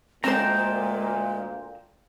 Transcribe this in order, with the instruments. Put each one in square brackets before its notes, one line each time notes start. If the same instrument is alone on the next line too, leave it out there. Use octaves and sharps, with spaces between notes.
[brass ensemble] D2 A#2 [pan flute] G#3 [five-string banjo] C4 C5 [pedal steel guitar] G5 A5 A#5